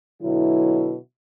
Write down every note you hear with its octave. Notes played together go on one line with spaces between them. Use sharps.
B2 D3 F#3 E4